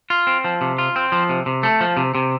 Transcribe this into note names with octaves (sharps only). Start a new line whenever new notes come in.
F4
C4
F3
C3
F4
C4
F3
C3
C3
A3
F3
C3
C3